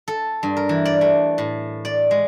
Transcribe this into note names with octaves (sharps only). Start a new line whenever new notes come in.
A4
G2
A#4
E3
D5
A3
A2
D5
G#3